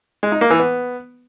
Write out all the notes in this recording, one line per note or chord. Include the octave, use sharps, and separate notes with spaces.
G#3
D#4
A#3
E3
B3